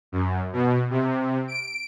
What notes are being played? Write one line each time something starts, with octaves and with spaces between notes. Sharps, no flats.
F#2
B2
C3
D7